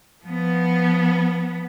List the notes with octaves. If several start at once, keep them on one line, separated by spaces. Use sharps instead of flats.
F3 B3